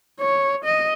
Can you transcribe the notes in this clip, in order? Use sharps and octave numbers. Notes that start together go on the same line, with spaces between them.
C#5
D#5